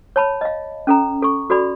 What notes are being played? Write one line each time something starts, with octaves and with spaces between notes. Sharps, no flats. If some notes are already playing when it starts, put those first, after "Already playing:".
C#5 A5 B5
D#5 F5
C#4 A4 A#5
A4 C#6
F#4 A4 D5 B5